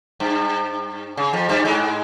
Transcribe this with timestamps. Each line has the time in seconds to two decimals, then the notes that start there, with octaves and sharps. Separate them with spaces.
0.20 G2
1.17 C#3
1.33 F2 F3
1.49 G2 G3
1.65 G#2 G#3